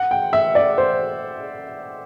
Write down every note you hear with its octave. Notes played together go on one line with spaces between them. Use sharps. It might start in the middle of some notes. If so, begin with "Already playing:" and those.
Already playing: F#5
G5
E5
D5
C5